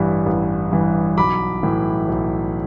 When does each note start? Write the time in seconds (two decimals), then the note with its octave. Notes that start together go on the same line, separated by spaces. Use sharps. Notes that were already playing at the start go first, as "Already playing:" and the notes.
Already playing: A1 G2 E3 G3
0.26 A1
0.72 G2 E3 G3
1.17 B1 B5 D6
1.63 A2 E3
2.08 B1